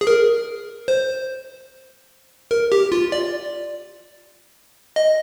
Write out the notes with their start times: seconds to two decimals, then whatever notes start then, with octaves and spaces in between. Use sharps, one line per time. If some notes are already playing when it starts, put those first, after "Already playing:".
0.01 G#4
0.07 A#4
0.88 C5
2.51 A#4
2.72 G4
2.92 F4
3.12 D5
4.96 D#5